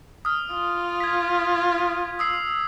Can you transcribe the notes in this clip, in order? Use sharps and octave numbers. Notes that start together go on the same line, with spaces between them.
D#6 F6
F4
G#6 B6
D#6 E6 C7